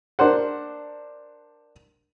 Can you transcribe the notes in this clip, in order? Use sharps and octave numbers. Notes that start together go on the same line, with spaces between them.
D4 A#4 C5 F#5